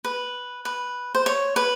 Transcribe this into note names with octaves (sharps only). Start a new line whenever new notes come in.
B4
B4
C5
C#5
B4